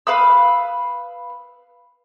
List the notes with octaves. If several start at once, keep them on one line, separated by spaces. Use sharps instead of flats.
B4 F5 B5 E6